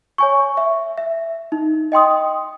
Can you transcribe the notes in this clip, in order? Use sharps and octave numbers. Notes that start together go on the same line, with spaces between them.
C#5 G#5 C#6
E5
E5
D#4
D#5 G5 C6 D#6